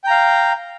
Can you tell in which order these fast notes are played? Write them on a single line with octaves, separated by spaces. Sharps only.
G5 A#5 F5